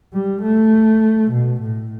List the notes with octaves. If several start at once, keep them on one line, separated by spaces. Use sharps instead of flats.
G3
A3
B2
A2